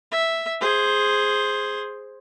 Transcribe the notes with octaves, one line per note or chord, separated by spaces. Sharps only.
E5
G#4 C5